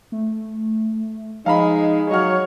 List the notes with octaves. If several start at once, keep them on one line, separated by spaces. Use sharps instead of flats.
A3
F3 G#3 D#4 F5 A#5 B5
F#3 C#5 D#5 F5 F#5 F6